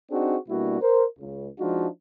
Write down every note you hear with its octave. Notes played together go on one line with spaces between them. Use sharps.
C4 D4 D#4 F#4 G#4
B2 G3 A#3 D4 E4 F#4
A#4 C5
C#2
F3 G#3 D4 D#4 F4 F#4